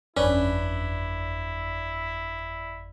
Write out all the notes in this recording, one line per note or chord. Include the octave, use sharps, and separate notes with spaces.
G1 F2 C#4 D4 E4 B4 D5